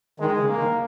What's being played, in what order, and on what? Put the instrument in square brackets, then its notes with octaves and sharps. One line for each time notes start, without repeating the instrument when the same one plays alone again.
[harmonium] D#3 [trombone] G#3
[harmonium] C#3
[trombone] A#3
[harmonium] D#3